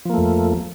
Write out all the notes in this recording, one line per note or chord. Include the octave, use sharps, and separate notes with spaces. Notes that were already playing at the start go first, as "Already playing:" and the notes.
F2 F3 A3 A#3